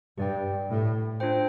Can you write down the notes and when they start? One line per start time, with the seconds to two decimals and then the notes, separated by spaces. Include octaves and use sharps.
0.17 G2 G4 D5 G5
0.69 A2
1.20 D4 F4 C5 G5